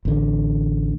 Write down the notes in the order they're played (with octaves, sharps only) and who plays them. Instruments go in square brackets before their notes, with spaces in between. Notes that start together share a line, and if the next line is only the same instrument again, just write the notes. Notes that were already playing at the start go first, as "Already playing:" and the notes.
[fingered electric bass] A1 D3